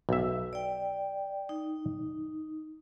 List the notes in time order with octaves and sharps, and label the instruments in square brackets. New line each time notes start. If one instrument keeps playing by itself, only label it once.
[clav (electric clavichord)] B1 E5
[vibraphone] D5 G5
D#4